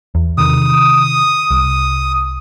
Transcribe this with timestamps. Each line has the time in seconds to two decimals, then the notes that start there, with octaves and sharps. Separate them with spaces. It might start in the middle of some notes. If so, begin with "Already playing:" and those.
0.15 E2
0.38 C3 D#3 D#6
1.51 C2